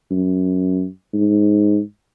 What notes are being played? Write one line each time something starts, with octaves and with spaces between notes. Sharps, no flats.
F#2
G#2